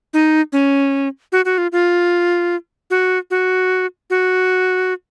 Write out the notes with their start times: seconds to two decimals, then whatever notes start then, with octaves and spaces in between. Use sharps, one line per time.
0.14 D#4
0.53 C#4
1.32 F#4
1.45 F#4
1.58 F4
1.72 F4
2.90 F#4
3.31 F#4
4.10 F#4